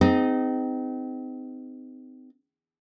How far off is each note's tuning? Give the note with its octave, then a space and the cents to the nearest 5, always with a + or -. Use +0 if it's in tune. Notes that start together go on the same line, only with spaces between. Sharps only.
C4 -30 D#4 -5 G#4 +0